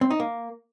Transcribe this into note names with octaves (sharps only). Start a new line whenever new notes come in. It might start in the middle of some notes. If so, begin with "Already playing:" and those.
C4
D#4
A#3